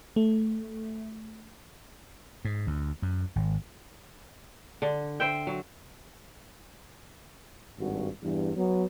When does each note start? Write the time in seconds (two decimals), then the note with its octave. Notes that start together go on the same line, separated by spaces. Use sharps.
0.16 A3
2.45 G#2
2.67 D2
3.02 F#2
3.36 G#1
4.82 D3
5.20 C5 E5 G5
5.47 F#3
7.80 G#1 G2 F#4
8.23 E2 G2
8.56 F#3 B3